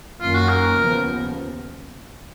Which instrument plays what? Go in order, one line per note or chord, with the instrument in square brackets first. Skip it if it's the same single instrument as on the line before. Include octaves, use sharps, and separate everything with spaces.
[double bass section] F#2 D#3 A#3 C#4 [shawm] F4
[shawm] F#4
A#4
[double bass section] D#2 C#3 F3 B3